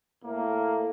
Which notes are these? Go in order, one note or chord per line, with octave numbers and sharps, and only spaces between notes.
A2 A#3